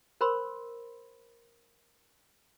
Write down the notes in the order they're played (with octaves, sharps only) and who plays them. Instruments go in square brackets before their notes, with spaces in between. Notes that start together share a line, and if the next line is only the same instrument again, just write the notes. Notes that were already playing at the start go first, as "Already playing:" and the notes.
[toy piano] A#4 C5 B5 C6 E6